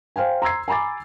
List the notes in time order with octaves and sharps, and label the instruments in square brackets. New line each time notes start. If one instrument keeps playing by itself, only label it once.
[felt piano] C5 F5 G5 G#5
A#5 C6 E6 G#6 C7
G#5 A#5 B5 D6 A6